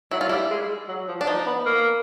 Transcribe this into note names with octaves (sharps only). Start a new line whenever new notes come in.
F#3 E4
F4
G3 E4
G#3
F#3
F3
D4
F3 D#4
B3
A#3